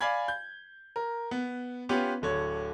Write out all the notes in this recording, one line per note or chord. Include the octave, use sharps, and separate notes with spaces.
D5 F5 G#5 B5 G#6
G6
A#4
B3
B3 C#4 F4 G4 B4
D1 D3 C#5